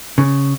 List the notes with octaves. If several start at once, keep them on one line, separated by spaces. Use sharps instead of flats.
C#3